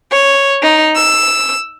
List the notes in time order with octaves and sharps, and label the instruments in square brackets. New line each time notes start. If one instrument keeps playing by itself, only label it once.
[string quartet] C#5
D#4
E6